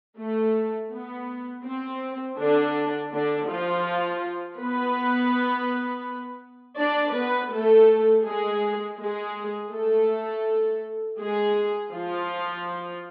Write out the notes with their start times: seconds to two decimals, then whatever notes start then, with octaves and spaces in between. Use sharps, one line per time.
0.19 A3
0.92 B3
1.66 C4
2.39 D3 D4
3.12 D3 D4
3.49 F3 F4
4.59 B3 B4
6.79 D4 D5
7.16 B3 B4
7.52 A3 A4
8.25 G#3 G#4
8.99 G#3 G#4
9.72 A3 A4
11.19 G#3 G#4
11.92 F3 F4